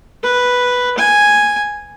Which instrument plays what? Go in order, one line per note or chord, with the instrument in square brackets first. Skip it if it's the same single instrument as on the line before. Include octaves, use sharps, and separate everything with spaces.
[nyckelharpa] B4
G#5